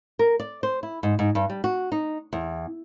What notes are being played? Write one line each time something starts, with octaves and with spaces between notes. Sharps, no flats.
A#4
D5
C5
E4
G#2
G#2
G2
G3
F#4
D#4
E2